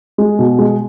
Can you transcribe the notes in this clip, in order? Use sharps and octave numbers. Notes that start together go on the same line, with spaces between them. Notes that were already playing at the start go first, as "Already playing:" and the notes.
G#3
B2
G#3